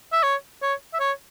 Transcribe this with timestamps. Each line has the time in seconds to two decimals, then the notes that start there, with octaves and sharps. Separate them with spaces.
0.12 E5
0.23 C#5
0.62 C#5
0.94 E5
1.00 C#5